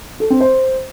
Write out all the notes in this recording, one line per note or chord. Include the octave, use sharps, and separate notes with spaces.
A4
C4
C5